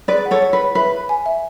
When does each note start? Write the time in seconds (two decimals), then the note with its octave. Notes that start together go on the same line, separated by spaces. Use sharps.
0.08 G#4 B4 D5
0.26 F#5
0.31 A4 C#5
0.42 C#5
0.53 B4
0.59 G#4
0.75 B4 E5
0.92 B5
1.09 G#5
1.26 E5